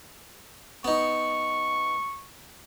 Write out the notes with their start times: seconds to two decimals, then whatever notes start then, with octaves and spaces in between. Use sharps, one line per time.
0.84 B3 D#4 C#6